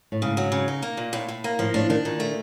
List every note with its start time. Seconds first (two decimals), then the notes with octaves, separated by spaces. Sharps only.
0.12 A2
0.22 G#2 C#3
0.37 F#3
0.52 C#3
0.68 D#4
0.82 A#3
0.97 A#2
1.13 A2
1.29 A2
1.44 A#3
1.59 A2 F3
1.74 A2 D4
1.90 D#3 D4
2.05 A#2 D#3
2.20 A3